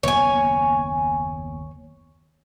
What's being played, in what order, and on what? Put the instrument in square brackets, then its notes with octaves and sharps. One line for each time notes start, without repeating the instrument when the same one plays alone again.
[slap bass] F#1 D#2 B3 [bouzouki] C#5 G#5